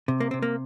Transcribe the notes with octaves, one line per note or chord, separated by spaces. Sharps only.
C3
A#3
C3 C4
A#3